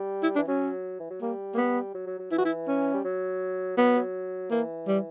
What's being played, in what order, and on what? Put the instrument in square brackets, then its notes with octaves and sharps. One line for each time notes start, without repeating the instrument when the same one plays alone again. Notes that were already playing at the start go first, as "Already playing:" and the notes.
Already playing: [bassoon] G3
[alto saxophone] E4
[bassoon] E3 [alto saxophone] D4
[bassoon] F#3 [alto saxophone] C#4
[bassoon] E3
F#3
[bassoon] G3 [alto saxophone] A#3
[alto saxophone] A#3
B3
[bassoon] F#3
F#3
F#3
[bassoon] E3 [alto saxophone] E4
[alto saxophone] F#4
E4
C#4
[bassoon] G3
F#3
[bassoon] F#3 [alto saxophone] B3
[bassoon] F#3
[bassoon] E3 [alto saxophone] A#3
[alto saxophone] G3